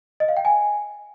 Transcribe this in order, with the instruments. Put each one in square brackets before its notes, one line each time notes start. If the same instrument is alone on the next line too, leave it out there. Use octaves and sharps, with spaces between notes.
[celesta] D#5
F5
G5
G#5